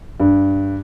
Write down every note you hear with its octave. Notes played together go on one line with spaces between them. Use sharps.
G2